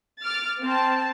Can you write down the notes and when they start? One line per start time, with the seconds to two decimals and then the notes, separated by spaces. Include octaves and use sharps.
0.21 D6 F6 A6
0.62 C4 A5